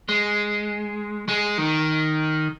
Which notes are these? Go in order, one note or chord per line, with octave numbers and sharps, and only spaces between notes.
G#3
G#3
D#3